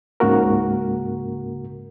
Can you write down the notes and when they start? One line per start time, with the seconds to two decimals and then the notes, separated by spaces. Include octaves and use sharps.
0.20 C#2 G#2 C#3 A#3 F#4 A#4